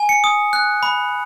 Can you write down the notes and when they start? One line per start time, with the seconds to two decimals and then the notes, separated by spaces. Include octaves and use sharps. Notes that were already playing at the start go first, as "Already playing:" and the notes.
Already playing: G#5
0.09 C#7
0.24 D#6
0.53 F#6
0.83 B5